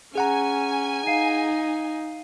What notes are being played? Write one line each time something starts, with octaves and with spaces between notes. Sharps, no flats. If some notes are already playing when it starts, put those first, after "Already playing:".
C#4 G#4 F#5 G#5 A#5
D#4 F5 C7 D#7